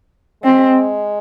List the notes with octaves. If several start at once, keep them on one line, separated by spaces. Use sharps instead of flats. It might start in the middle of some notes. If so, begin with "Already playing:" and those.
G#3 C4